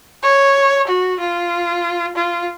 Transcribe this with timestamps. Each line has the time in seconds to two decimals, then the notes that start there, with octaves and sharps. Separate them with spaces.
0.23 C#5
0.87 F#4
1.19 F4
2.15 F4